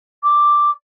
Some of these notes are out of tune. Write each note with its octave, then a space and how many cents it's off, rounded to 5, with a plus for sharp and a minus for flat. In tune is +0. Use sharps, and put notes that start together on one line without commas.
D6 +0